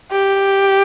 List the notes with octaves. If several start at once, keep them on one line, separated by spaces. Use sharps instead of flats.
G4